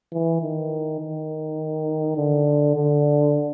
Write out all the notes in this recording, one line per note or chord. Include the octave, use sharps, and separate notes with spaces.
E3
D#3
D#3
D3
D3